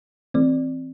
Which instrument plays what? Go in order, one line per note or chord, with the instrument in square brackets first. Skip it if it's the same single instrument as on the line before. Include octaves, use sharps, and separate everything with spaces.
[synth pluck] E3 A3 C4 D5